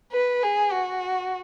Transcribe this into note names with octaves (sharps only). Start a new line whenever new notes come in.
B4
G#4
F#4